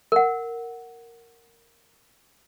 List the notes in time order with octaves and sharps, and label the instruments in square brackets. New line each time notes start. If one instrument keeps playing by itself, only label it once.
[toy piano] A#4 F#5